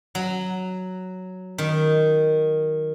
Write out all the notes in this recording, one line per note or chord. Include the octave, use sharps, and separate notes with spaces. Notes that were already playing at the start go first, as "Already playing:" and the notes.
F#3
D#3